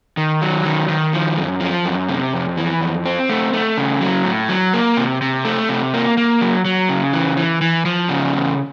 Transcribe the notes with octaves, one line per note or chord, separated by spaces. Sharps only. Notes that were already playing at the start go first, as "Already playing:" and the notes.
D#3
F#3
D#3
D#3
F3
F#2
F3
F#2
C3
F2
E3
F2
C4
A3
A3
C#3
F#3
A2
F#3
A#3
C3
C3
A3
C3
A#3
A#3
F#3
F#3
C#3
E3
E3
E3
F3
C#3
E2